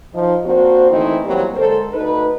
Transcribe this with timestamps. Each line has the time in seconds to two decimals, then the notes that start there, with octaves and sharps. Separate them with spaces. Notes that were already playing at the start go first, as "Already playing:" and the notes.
0.14 F3 D#4
0.45 A#3 C4 D4 F#4 C5
0.91 D#3 E3 A3 C4 D#4 E4
1.25 B2 E3 F#3 G3 A#3 C4
1.56 D3 G#3 A4 A#4 C5
1.93 D2 D#4 A4 B4